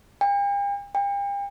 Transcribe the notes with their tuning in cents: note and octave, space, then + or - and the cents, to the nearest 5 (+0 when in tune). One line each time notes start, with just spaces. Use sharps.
G5 +45
G5 +40